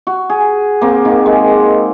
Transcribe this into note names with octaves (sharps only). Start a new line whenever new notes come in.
F#4
G#4
A#3 C4
D#3 A#3
G#3
F#5